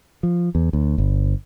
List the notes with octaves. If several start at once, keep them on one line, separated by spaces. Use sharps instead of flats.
F3
E2
D2
G1